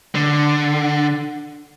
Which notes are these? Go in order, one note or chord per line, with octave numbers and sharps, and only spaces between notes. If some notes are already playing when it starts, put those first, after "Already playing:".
D3